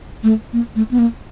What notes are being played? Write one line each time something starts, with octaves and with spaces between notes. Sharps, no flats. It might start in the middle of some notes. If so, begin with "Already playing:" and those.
A3
A#3
A3
B3
A#3